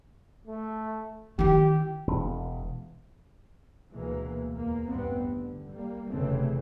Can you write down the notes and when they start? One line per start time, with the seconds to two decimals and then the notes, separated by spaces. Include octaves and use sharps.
0.47 A3
1.39 D#3 E4 G4
2.07 E1
3.92 D2 B2 E3 G#3 A#3
4.55 E2 A#3
4.89 A1 E2 G2 B3 C4
5.34 D3
5.69 G3 A#3
6.10 F1 E2 C#3 E3 A3 C4